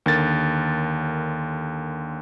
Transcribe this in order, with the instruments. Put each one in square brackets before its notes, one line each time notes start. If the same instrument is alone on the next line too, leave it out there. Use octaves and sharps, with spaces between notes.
[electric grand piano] D#2 D3 A#4 A6